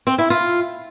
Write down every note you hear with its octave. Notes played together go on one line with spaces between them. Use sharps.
C4
E4
F4